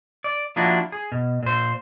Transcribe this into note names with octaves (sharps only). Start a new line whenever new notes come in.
D5
F3 A#3 D4 E4 F#4
G#4
B2
A#2 C5